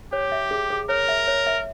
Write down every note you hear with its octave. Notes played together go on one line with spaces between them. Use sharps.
G4 C#5
E5
G#4
G#4
A#4 C#5
E5
C#5
E5